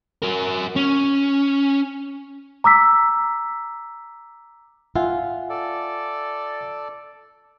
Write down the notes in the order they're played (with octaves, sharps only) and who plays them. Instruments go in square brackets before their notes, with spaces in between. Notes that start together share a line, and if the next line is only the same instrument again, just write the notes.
[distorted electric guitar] F#4 A#4
C#4
[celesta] A#5 D6 E6 B6
[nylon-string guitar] F4 [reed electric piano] E5 F#5 G#5
[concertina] A4 D5